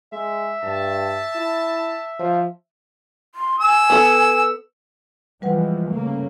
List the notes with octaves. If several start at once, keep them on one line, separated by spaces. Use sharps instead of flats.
G#3 E5
G2 A5
E4
F3
C6
G#5 E6
B3 A4
E3 F3 G3 G#3 B4 F#5
C#3 A3 A#3